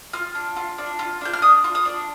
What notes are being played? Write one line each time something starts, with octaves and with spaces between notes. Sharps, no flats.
F4 F6
D4
F4
D4
F4
D4 G6
F6
D4 D#6
F4
D#6
D4